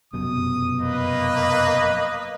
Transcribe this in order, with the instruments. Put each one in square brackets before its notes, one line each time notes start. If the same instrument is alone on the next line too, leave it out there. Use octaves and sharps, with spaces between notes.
[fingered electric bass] F1 F#2 B2 [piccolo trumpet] D#6
[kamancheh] A#3 D#5 [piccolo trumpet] B4